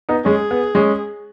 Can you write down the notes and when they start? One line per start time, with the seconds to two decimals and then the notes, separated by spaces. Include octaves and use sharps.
0.09 B3 D#4
0.25 G#3 C#4 G#4
0.51 B3
0.75 G#3 C#4